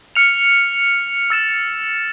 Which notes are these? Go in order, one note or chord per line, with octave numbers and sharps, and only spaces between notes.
F6 C#7 F7
E6 A6 E7